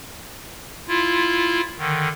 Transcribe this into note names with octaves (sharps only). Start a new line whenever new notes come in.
E4 F4
D3 D#3